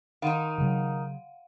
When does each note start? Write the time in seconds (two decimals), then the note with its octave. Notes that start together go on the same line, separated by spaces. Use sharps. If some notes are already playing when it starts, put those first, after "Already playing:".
0.22 D#3 D#4 F5 F#5
0.58 C#3 F#3